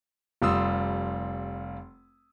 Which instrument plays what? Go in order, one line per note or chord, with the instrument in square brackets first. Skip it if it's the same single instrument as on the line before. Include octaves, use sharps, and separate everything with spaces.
[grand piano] F1 G3 F4 C6 D#6 E6